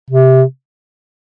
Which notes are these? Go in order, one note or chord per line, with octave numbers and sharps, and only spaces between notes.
C3